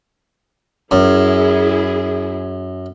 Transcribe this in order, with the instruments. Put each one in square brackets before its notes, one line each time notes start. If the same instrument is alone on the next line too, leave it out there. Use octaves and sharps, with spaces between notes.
[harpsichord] F#2 [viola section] E4 G#4